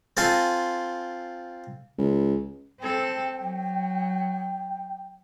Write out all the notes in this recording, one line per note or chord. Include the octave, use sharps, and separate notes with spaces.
C4 F4 A4 G#5 C6
C#2
C4 A4 G5
F#3